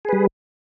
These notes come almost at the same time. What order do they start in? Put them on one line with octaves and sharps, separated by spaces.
G#4 B4 G3